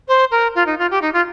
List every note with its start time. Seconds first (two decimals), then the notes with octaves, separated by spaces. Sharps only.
0.08 C5
0.31 A#4
0.55 F4
0.66 D#4
0.78 F4
0.91 G4
1.02 D#4
1.13 F4